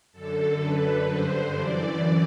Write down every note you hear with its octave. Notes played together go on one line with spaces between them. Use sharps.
F#2 D3 A4
F#2 D3 B4
G2 D3 C5
F#2 E3 D5